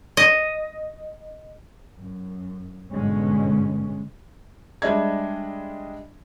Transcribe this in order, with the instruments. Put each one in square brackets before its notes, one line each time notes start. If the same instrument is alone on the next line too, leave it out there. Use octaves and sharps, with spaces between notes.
[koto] D#5
[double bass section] F#2
G1 G#2 B2 D3 G#3 C#4
[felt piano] G3 G#3 D4 D#5 E5 G#6